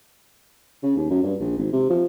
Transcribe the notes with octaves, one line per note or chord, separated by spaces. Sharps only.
C#3
D#2
F#2
G2
A#1
G#1
C3
F3